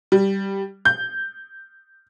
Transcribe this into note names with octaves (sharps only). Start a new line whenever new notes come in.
G3
G6